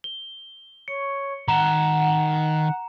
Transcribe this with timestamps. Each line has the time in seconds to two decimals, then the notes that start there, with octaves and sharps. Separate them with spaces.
0.04 G7
0.88 C#5 C#7
1.48 D#3 F#5 A#5 C6 E7